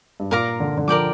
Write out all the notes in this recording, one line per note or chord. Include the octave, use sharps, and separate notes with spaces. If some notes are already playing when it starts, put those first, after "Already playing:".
G2
A#2 A#4 F5 A#5 D6
D3
D3
F3 A#4 D5 G5 D6